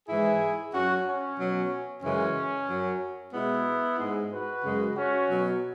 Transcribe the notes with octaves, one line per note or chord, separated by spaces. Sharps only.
G#2 E3 G#3 E4 G#4
F#2 F#3 C#4 F#4
C#4
B2 F#3
F#2 C#3 E3 G#3 C#4
F#2 F#3
B2 G#3 B3 E4
G#2 G#3
F#4 B4
F#2 C#3 G#3
C#4 F#4
B2 F#3